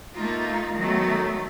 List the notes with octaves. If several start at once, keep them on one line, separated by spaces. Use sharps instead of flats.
A3 A#3 D#4 F4
D#3 F#3 G#3 A3 B3